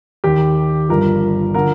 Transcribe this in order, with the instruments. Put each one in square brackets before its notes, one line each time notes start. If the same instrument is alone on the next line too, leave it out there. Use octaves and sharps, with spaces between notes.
[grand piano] D#2 D#3 G4
G1 G2 F3 A#4
D3 F3 A#4